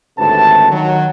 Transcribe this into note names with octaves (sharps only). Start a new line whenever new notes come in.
G#1 D2 A2 C3 B4 A5
D#3 F#3